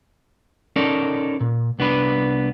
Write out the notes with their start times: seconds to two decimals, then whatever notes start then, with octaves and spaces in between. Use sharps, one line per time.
0.76 C#4 D#4 A4 A#4 D5
1.40 A#2
1.79 C2 B3 D4 B4